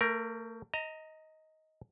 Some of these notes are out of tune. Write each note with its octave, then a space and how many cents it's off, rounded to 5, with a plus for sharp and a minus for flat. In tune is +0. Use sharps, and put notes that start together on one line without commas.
A3 +35 A#4 +10
D#5 +15 A#5 -20